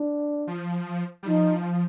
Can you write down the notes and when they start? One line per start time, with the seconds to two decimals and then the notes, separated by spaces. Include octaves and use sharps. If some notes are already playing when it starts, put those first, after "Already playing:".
Already playing: D4
0.47 F3
1.23 G3
1.27 F3 D#4